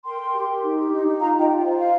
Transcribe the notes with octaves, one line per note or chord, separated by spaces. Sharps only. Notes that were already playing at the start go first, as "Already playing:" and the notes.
A#4 G5 C6
A#4
G4
G4
D#4
G4
D#4
D#4
F4 F5 A#5
F4 D#5 G5
F4
F5
C5
F4 F5